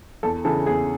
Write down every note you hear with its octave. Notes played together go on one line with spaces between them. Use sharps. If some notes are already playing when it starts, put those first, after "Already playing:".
E2 A4
C#3 E3 A4
E2 G#4